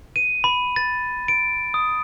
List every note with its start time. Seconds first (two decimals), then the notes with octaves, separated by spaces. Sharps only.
0.16 D#7
0.44 B5
0.76 A6
1.28 D7
1.74 D#6